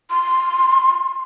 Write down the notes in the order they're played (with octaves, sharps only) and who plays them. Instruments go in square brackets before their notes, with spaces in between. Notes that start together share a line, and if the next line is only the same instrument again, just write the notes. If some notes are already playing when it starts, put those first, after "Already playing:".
[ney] C6